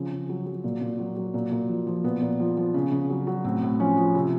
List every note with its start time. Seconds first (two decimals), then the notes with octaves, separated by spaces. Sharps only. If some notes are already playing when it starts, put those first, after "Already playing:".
Already playing: C#3 F3 C4
0.11 C#3
0.29 F#3
0.46 F#3
0.64 A#2
0.81 A#2
0.99 F#3
1.16 F#3
1.34 A#2
1.51 A#2
1.69 F3
1.87 F3
2.04 A#2 B3
2.22 A#2
2.40 F3
2.57 F3
2.74 C#3
2.92 C#3
3.10 F#3
3.27 F#3
3.44 A2 C4
3.62 A2
3.80 F3 C#4
3.97 F3
4.15 C3